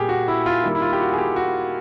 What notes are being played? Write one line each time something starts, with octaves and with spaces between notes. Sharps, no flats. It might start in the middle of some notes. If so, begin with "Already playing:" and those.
Already playing: A#2 G3 A#3 G4 G#4
F#4
E4
F4
D#3 G3 A#3 E4
E4
F4
G4
F#4
G#4
G4
F#4